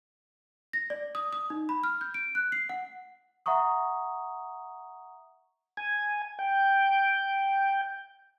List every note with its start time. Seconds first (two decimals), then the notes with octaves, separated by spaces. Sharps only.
0.73 A#6
0.90 D5
1.15 D#6
1.33 D#6
1.50 D#4
1.69 B5
1.83 F6
2.01 G6
2.14 D7
2.35 F#6
2.52 C7
2.69 F#5
3.46 E5 F#5 A#5 C#6 D#6
5.77 G#5
6.39 G5